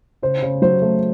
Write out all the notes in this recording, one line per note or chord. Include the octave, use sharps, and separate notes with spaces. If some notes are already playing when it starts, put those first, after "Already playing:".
C#3 C5
C#3
F#3 C5
A3